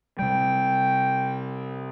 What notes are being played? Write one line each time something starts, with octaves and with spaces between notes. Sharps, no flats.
C3 G3 G5